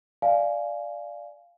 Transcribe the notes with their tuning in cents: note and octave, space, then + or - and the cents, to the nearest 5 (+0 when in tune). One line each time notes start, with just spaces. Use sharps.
D5 +0 F5 -10 G#5 +15